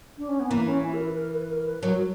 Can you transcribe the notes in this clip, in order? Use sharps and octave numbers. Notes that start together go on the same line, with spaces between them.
D4
C#4
B3
E3 A#3
C#4
E4
A#4
B4
A#4
B4
A#4
B4
F#3 A#4